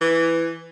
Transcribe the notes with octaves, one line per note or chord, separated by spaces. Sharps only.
E3